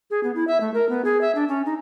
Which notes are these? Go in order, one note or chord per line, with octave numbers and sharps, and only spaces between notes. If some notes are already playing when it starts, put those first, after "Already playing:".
G#4
B3
E4
E5
A3
A#4
B3
G#4
E5
D4
C#4
D#4